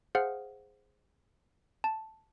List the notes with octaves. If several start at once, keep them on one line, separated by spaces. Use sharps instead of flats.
G#4 C5 F5 F#5 F6
A5